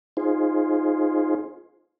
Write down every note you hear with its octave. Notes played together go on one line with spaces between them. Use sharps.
D#4 F4 G#4 C5